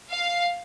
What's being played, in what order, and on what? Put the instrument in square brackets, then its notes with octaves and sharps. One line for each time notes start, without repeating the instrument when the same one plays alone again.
[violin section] F5